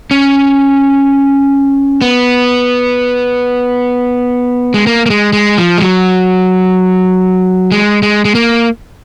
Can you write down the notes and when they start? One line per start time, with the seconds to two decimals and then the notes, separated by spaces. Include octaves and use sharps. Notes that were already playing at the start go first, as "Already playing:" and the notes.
0.11 C#4
2.02 B3
4.74 G#3
4.87 A#3
5.06 A#3
5.10 G#3
5.33 G#3
5.58 F3
5.77 G#3
5.82 F#3
7.72 G#3
8.03 G#3
8.25 G#3
8.35 A#3